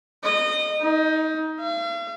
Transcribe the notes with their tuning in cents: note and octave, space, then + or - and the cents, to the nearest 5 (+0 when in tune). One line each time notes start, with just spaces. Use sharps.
D#5 -25
D#4 +20
F5 -45